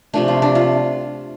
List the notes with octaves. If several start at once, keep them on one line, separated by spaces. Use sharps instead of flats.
C3 F3 A3 D4
F4
D4
F4